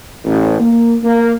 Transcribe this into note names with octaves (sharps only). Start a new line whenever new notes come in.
A1
A#3
A#3